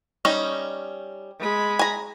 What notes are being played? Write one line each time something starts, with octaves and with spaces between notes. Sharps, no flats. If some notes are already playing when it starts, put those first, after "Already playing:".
G3 C#4 D#4
G#3 B5
G#5 A#5